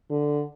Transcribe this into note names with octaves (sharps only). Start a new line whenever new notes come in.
D3